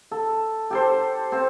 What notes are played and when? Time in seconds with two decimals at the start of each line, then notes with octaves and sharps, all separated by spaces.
0.11 A4
0.70 G4 A4 C5
1.32 C4 C5